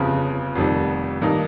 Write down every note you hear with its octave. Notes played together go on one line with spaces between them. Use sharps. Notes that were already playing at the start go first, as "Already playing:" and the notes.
Already playing: G1 F2 C#3
F1 F2 D#3 G3
G2 D#3 A#3 D#4